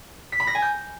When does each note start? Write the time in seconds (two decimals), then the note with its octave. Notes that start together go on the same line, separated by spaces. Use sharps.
0.32 B6
0.40 B5
0.47 A#6
0.55 G#5
0.62 G6